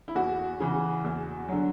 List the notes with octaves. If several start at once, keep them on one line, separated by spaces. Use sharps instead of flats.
E4
E2 F#4
C#3 E3
E2
D3 F#3